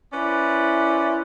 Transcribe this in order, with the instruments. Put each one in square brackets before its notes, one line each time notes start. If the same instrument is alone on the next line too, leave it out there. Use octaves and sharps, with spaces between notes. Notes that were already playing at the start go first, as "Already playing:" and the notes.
[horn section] C#4 E4 B4 C5 D5